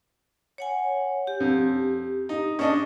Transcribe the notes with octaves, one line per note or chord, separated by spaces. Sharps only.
C#5 F#5 G#5
G4
F2
D#4
C#4 D4 D#5